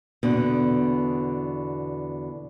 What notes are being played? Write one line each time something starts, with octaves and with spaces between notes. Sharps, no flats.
E2 B2 D3